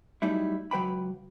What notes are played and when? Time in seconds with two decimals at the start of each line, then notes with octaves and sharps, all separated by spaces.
0.22 F#3 G3 A3 D#4 E4
0.71 C#2 F#3 B4 G5 B5